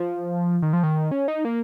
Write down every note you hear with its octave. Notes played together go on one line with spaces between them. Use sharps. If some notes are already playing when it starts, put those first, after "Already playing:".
Already playing: F3
D#3
F3
D#3
C#4
D#4
A#3